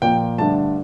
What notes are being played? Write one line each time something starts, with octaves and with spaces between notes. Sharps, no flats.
A#2 F3 A#3 G5
G2 D3 A3 D4 A5